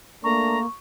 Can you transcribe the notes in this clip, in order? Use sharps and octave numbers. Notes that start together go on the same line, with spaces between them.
A3 A#3 D4 A#4 A#5 C#6